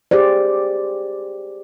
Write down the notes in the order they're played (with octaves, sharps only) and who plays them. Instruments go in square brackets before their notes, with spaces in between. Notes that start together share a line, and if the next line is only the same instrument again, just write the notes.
[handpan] G4 G#4 C5 D5